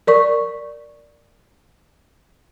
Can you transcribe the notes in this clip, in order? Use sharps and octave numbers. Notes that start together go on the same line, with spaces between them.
A#4 D5 C#6